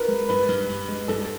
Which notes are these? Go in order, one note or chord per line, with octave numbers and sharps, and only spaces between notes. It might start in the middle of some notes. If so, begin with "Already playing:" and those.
Already playing: A#4 B4
G#3
G2 B4
G2
G2
G#3
G2 A4